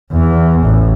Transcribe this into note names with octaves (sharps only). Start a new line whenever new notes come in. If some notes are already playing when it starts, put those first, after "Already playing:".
E2
A1